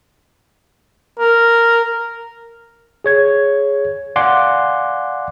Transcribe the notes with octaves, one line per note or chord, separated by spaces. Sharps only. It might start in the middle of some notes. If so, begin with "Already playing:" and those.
A#4
G#4 C#5 G#6
D5 F5 F#5 G#5 C6 D6